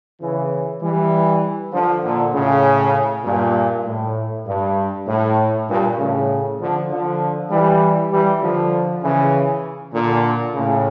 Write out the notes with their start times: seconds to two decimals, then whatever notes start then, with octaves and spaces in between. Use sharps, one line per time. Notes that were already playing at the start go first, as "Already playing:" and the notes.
0.20 C#3 E3
0.81 E3 G3
1.72 D3 F3
2.03 A#2 D3
2.33 A2 C#3
3.24 G2 A#2
3.86 A2
4.46 G2
5.07 A2
5.68 G2 A#2
5.98 A2 C#3
6.59 D3 F3
6.89 D3 F3
7.50 E3 G3
8.11 E3 G3
8.41 D3 F3
9.03 C#3 E3
9.93 A#2 D3
10.54 A2 C#3